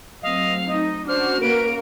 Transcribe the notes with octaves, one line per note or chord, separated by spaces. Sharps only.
F#3 A3 C4 D#5 F5
D#4 D#5
C#4 D4 F#4 C5 F6
A#3 A#4 B4 D7